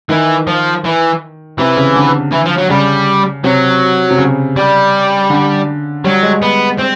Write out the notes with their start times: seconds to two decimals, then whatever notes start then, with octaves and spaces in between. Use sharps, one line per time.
0.09 D#3 E3
0.47 F3
0.84 E3
1.58 C3 E3
1.77 C#3
1.95 D3
2.32 E3
2.46 F3
2.58 F#3
2.70 C#3 G3
3.44 C3 F#3
4.11 C3
4.18 C#3
4.56 G3
5.30 D3
6.04 F#3 G3
6.23 G#3
6.42 B3
6.79 C4